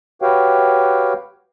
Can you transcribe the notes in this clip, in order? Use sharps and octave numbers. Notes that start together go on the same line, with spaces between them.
F#4 G4 B4 C#5 F5 G5